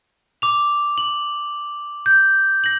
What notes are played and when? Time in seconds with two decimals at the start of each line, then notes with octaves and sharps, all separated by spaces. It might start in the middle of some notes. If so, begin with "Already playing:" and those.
0.42 D6 F7
0.98 F#7
2.06 G6
2.64 A#6 F#7